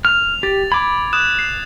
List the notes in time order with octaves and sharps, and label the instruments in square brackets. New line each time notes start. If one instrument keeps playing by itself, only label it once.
[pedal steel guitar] F6 [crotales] F7
[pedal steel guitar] G4 [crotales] A6
[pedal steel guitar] B5 D6 [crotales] G#6
[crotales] D#6 F#6 E7
C7